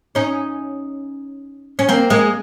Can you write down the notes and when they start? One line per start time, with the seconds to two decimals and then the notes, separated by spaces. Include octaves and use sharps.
0.15 C#4 D#4
1.79 C#4
1.89 A#3 C4
2.10 G#3 A#3